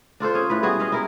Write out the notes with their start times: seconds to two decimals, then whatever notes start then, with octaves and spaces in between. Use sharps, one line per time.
0.20 D4 F4 A4 C5
0.34 C#4 G#4
0.50 A2 B4
0.63 G3 B3 F#4 G#4
0.80 B3 D#5 F5
0.92 E4 A#4